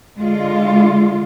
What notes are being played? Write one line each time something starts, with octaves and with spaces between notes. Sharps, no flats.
D3 G#3 F4